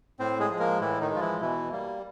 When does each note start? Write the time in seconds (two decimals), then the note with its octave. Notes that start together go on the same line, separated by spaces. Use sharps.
0.19 A2 C4 C5
0.39 G#3 G#4
0.50 F3 G#3
0.60 A#3 A#4
0.81 A2 E3 E4
1.01 D#3 D#4
1.11 F3 G#3 F4
1.21 E3 E4
1.41 B2 E3 E4
1.72 G3 A#3